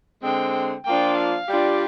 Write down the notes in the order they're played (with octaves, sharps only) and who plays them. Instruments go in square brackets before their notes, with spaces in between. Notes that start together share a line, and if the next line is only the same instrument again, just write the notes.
[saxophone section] D3 G#3 C4 [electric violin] G5
[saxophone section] F3 A#3 D4 F4 [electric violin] G5
[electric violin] F5
[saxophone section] G3 D4 F4 [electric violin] G4